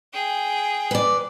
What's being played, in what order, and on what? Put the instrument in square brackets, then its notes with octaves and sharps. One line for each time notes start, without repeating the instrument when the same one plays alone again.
[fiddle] G#4 G5
[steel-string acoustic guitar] B4 D5